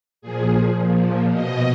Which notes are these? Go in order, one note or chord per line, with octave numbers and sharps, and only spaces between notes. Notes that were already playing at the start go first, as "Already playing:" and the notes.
A#2 F3 G#4
A#2 F3
B2 D#5